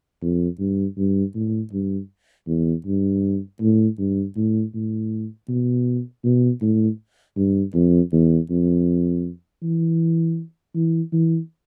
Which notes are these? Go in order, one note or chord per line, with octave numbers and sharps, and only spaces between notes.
F2
G2
G2
A2
G2
E2
G2
A2
G2
A2
A2
B2
B2
A2
G2
F2
E2
F2
E3
E3
E3